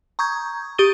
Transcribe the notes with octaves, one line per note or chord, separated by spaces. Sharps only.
A#5 C#6 D#6 G6 G#6
G4 C#6 D#6 A6 D#7 G7